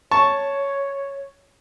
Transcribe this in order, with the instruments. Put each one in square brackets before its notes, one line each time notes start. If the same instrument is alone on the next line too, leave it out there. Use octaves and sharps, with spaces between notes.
[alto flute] C#5 [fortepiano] A5 C#6